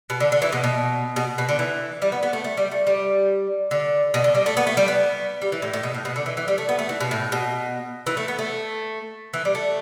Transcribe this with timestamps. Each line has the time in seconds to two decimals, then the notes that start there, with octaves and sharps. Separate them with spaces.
0.10 B2
0.20 D3
0.32 D3
0.42 E3
0.52 B2
0.64 B2
1.16 B2
1.38 B2
1.49 D3
1.59 E3
2.02 G3
2.12 B3
2.23 B3
2.33 A3
2.44 A3
2.57 G3
2.72 A3
2.87 G3
3.71 D3
4.14 B2
4.24 D3
4.35 G3
4.46 A3
4.57 B3
4.67 A3
4.77 G3
4.88 B3
5.42 G3
5.52 E3
5.62 A2
5.73 A2
5.83 B2
5.94 A2
6.05 B2
6.16 D3
6.26 E3
6.37 E3
6.48 G3
6.58 A3
6.69 B3
6.79 A3
6.89 E3
7.00 B2
7.11 A2
7.32 B2
8.07 E3
8.17 A3
8.28 B3
8.39 A3
9.34 E3
9.45 G3
9.55 A3